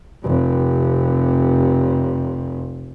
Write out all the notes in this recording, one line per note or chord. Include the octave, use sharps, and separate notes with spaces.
F1 C3